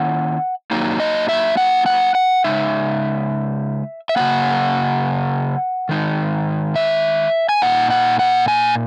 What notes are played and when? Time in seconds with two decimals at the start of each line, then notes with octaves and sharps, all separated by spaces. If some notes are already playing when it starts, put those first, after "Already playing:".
Already playing: D#3 A#3 C#4 E4 F#5
0.71 F#3 A#3 D#4
1.00 D#5
1.29 E5
1.57 F#5
1.86 F#5
2.15 F#5
2.44 C#3 G#3 D#4 E5
4.09 E5
4.16 C#3 F#3 A#3 F#5
5.89 D#3 G#3 D#4
6.76 E5
7.49 G#5
7.62 A#2 A#3 D#4 F#5
7.90 F#5
8.19 F#5
8.48 G#5